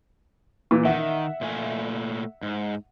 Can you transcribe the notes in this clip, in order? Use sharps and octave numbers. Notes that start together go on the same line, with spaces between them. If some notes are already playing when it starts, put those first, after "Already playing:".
A#2 E3
D#3 E5 F#5
A#2 A3 G#5
G#2